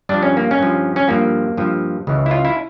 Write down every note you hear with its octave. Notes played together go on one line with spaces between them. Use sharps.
G2 F3 D4
C#4
A#3
C#4
G2 F3
C#4
G2 F3 A#3
G2 F3
C#2 C#3 E3
E4
F4
E4